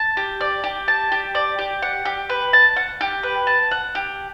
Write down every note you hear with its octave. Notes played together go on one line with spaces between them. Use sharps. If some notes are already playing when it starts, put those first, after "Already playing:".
Already playing: A5
G4
D5
G4
A5
G4
D5
G4
F#5
G4
B4
A5
F#5
G4
B4
A5
F#5
G4